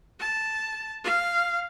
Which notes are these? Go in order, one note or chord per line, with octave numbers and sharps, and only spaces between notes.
A5
F5